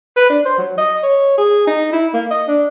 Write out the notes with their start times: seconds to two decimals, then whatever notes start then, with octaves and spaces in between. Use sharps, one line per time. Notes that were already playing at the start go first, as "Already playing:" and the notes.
0.16 B4
0.30 D4
0.45 C5
0.58 F#3
0.78 D#5
1.03 C#5
1.38 G#4
1.67 D#4
1.93 E4
2.14 A#3
2.31 D#5
2.48 D4